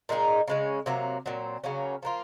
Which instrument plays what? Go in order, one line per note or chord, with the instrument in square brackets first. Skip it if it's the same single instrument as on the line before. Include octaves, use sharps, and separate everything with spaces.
[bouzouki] A#2 G#3 D#4 G#4
C#3 G#3 C#4
C3 F#3 A#3
A#2 F#3 C4
C#3 F#3 A#3 C#4
F3 A#3 F4